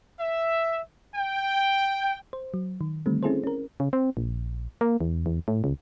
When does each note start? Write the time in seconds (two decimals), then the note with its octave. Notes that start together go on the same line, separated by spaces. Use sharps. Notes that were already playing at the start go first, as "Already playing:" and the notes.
0.19 E5
1.16 G5
2.33 C5
2.54 F#3
2.81 D#3
3.06 D3 D#3 G3 A3 C4
3.23 C4 C#4 E4 G#4 A4 C5
3.44 C#4 A#4
3.80 C#3
3.93 C4
4.17 A#1
4.81 A#3
5.01 E2
5.26 E2
5.48 A2
5.64 C#2